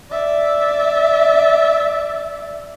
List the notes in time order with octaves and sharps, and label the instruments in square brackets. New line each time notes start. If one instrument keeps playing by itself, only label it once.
[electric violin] D5 E5